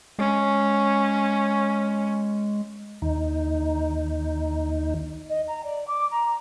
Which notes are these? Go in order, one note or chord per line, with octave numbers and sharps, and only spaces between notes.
G#3 C#4
D#2 D#4
D#5
A#5
D5
D6
A#5